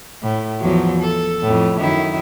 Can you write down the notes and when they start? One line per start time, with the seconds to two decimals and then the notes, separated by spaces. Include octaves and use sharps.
0.23 A2
0.60 E2 F3 F#3
1.01 A4
1.43 F2 A2
1.79 F#2 D#3 E4